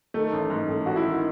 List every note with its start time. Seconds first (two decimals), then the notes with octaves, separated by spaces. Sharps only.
0.14 D#3 A3
0.33 A1
0.50 G#2
0.68 A1 A3
0.86 A1 F#4
0.96 E4
1.05 D#3